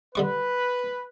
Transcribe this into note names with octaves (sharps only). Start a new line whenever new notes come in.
D3 G3 B4 C#6